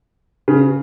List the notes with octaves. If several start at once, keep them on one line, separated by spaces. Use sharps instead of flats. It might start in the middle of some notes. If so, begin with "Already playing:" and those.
C#3